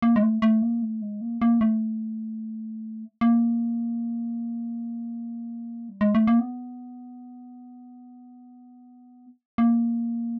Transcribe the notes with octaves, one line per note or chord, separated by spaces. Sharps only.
A#3
G#3
A3
A3
A#3
A3
G#3
A#3
A#3
A3
A#3
G3
G#3
A3
A#3
B3
A#3